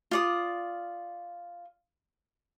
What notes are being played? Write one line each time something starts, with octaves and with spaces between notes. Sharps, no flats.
F4 D5 D#6